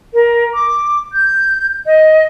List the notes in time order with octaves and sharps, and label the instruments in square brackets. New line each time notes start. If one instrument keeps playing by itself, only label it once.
[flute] A#4
D6
G6
D#5